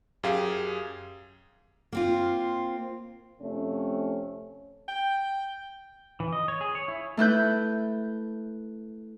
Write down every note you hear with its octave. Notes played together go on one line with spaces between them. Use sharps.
F#2 G4 G#4 F5
A#3 C4 F4
F2 C3 A3 C#4
G5
E3
D#5
C#5
G#4
C#5
E4
A3 E4 B4 G6